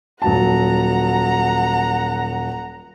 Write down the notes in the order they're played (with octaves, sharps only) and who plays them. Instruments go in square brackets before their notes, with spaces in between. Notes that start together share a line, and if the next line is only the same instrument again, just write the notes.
[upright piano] D#1 F#3 A5 [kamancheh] F#5 A#5